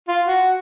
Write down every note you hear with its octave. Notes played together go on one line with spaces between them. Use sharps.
F4
F#4